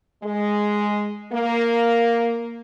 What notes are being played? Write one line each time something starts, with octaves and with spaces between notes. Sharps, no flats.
G#3
A#3